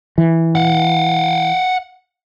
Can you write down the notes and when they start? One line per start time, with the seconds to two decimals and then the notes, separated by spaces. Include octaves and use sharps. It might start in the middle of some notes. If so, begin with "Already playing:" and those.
0.18 E3
0.55 F5 F#5